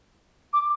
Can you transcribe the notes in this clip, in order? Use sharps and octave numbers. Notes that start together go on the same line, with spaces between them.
D6